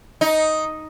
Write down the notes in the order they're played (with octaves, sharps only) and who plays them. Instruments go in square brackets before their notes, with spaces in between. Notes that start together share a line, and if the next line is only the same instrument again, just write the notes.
[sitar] D#4